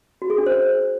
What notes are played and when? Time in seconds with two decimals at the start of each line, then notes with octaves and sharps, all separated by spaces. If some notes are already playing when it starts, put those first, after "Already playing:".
0.22 F#4
0.30 G#4
0.38 D4
0.46 C5